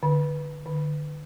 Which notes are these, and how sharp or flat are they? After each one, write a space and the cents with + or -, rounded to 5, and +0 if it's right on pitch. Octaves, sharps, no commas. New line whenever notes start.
D3 +15
D3 +35